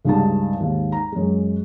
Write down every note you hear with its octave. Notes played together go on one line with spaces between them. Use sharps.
C#2 G2 D#4 A5
D#2 G#2
A#5
F#2 G#3